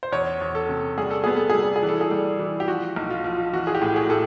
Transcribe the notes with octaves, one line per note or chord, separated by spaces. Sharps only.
C5
E2 C#5
E2
A4
C3
G3 G#4
A4
B3 G#4
A4
G3 G#4
A4
G#4
E3
A4
G#4
G3
E3
G4
F3 F#4
B1
F4
F3
F4
E3 F#4
G#4
G4
A2
G#4
A2 A4